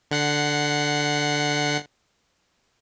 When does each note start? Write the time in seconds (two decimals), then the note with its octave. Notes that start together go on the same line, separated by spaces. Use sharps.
0.11 D3 F#5 C7